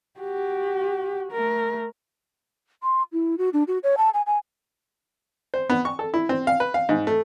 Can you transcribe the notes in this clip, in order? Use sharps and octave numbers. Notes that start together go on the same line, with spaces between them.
F#4 G4
A3 A#4
C6
E4
F#4
D4
F#4
C#5
A5
G#5
G#5
C5
B3
C#6
A4
E4
C4
F5
B4
F5
G#2
A3